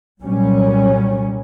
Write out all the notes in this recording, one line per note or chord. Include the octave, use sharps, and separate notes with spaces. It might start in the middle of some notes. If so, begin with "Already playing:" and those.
C2 A#2 F#3 G3 C#4